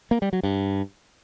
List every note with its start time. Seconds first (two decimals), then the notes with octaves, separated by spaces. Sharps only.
0.11 A#3
0.22 G3
0.33 F#3
0.43 G2